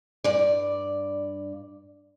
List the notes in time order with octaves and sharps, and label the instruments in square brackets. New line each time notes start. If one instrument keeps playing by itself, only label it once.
[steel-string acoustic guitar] G2 D5